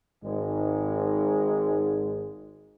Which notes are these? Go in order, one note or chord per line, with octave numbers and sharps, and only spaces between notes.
G#1 G#2 G#3